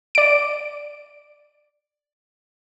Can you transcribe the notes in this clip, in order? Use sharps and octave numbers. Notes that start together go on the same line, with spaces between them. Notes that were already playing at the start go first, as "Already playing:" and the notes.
D5 D7